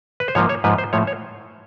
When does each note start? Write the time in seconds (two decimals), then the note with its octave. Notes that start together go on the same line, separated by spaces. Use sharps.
0.20 B4
0.28 C5
0.35 G#2 F3 A#3 C#5
0.49 C#5
0.64 G#2 F3 A#3 B4
0.78 C5
0.93 A2 F3 A3 C#5
1.07 C#5